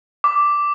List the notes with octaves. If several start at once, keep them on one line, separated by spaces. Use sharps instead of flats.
D6